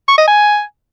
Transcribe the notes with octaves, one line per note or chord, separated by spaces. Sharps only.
C#6
D#5
G#5